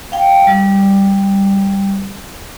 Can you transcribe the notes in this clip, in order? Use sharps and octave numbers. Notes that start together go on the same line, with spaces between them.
F5 G5
G3